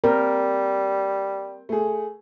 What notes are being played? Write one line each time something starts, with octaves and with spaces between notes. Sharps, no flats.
G3 C4 A#4
A3 G#4